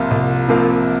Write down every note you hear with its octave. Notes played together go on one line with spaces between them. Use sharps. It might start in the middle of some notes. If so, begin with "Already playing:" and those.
Already playing: C2 C3 F3 A#3 F4
C2
C3 F3 A#3 F4